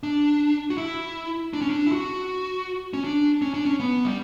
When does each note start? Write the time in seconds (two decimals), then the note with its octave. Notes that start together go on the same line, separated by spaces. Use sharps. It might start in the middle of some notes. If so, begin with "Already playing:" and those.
0.03 D4
0.70 F#4
0.78 E4
1.53 D4
1.61 C#4
1.70 D4
1.87 E4
1.92 F#4
2.93 C#4
3.04 D4
3.42 C#4
3.54 D4
3.65 C#4
3.80 B3
4.05 G3